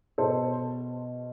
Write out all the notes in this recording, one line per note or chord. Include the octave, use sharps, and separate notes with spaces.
B2 A4 C5